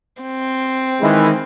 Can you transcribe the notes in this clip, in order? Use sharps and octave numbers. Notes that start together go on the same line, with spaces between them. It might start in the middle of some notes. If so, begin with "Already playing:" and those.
C4
D#3 E3 G#3